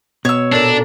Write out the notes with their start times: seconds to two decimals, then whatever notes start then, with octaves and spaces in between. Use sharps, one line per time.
0.25 B2 C#5 E6
0.52 A#2 D4 A4 A#4